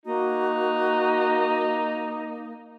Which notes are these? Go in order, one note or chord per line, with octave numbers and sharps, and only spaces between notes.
A#3 D#4 F#4